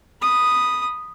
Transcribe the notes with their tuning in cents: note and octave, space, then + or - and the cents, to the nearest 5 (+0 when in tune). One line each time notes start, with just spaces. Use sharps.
B5 +0 D#6 -5